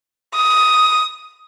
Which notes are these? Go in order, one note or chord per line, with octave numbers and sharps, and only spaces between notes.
D#6